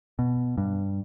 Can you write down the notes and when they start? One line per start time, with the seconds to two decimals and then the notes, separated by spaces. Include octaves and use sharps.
0.19 B2
0.58 G2